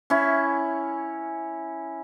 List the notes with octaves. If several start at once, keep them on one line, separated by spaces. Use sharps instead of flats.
C#4 E4